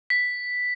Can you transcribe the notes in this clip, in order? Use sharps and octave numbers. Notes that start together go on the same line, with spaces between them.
B6